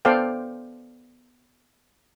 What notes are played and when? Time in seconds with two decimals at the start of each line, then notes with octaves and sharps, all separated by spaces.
0.05 B3 A4 C5 D5 F5 G5